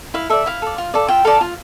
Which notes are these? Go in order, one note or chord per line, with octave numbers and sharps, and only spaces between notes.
E4 F5
A4 D5 E5
E4 F5
A4 D5
F4
A4 D5
F4 E5 G5
A4 D5 F5 A5
F4